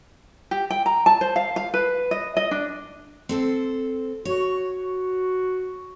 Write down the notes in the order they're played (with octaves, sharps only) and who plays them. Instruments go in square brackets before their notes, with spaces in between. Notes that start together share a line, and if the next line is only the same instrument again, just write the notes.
[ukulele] G4
G5
A#5
A5
C5
F5
F5
B4
D#5
D#5
D4
[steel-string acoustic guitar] C4 A4 C5
[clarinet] F#4 [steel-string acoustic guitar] C#5